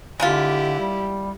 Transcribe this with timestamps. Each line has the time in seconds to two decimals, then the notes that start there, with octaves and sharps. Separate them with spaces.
0.20 D3 G#3 A#3 E4 F4 G4
0.80 G3